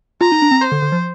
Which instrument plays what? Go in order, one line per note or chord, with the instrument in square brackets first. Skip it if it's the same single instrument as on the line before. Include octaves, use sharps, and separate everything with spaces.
[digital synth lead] F4 [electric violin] A#5
[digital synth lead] D#4
D4
C4
[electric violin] C5
[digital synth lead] D3
D3
F3